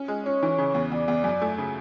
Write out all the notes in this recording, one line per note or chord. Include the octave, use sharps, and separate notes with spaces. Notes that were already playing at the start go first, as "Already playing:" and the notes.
Already playing: C#4
G#3
C#4 C#5
E3
C#3
E2
E2 D5
E2
F#2
A3
C#3